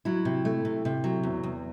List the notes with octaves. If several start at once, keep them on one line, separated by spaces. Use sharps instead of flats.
F#3 E4
C3
A3
C3
C3
F#3
E2
E2